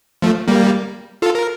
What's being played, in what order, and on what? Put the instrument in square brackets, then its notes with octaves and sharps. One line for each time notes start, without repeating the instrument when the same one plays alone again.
[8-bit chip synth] F3 A3
G3 A#3
F4 A4
A#4